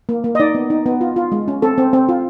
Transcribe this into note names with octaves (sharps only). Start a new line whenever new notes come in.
A#3
A#3
D#5
D#4 D5
B3
D#4
B3
F4
F4
G#3
C#4
C4 A4
C4
C4
F4